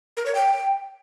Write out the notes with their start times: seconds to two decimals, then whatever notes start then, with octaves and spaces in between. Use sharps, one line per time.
0.17 A#4
0.26 C#5
0.35 G5